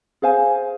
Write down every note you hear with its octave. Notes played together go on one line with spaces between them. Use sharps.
G#4 C5 F5 G#5